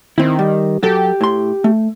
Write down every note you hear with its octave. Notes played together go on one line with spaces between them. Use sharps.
D#3 C4 E4
G3
F#3 G4 A4
A2 C6
A3